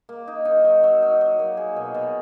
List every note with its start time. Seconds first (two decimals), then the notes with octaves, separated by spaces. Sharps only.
0.09 A#3
0.28 D#4
0.45 D#4
0.64 F#3
0.84 F#3
1.02 D#4
1.21 F#3
1.39 A#3
1.57 G#4
1.76 B2
1.94 B2